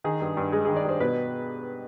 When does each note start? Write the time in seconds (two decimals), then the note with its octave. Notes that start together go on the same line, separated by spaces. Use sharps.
0.04 D#3 G#4
0.21 G2
0.37 G2
0.52 G#3 G#4
0.65 G#4
0.68 D#3
0.76 D5
0.85 G2 C5
1.00 B2 B4